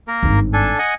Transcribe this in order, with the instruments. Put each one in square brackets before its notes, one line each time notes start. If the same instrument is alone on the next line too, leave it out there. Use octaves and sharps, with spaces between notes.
[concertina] A#3 A#4
[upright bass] G#1 G2
[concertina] D4 A4 G#5
D#5 F#5 G#5